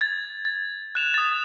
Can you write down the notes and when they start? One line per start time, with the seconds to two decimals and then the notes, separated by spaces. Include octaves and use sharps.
0.01 G#6 A6
0.45 A6
0.95 F#6 E7 F7
1.14 D#6 A6